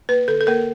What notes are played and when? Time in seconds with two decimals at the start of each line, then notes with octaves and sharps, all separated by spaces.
0.09 A#3 B4
0.28 D3 A4
0.41 A4
0.47 A#3 A#4